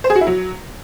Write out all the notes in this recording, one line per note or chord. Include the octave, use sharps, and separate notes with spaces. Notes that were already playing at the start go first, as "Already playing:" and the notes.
C5
G#4
F#4
E4
F#3